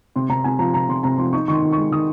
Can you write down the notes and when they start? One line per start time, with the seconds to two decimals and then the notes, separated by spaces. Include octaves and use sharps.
0.16 C3 C6
0.29 C3 A#5
0.44 C3 G#5
0.59 F3 A#5
0.74 C3 A#5
0.89 C3 C6
1.03 C3 A#5
1.18 F3 C6
1.33 D#4 C#6
1.48 D#3 C#6
1.53 C6
1.62 D#3
1.72 G#3 C#6
1.92 D#3 D#6